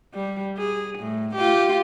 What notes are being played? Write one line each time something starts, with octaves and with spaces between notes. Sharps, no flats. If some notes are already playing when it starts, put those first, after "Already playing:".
G3
G#4
A2
F4 G4